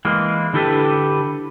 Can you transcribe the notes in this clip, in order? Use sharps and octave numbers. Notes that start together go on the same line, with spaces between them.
E3 G#3 A#3
D3 E4 G4 A4 B4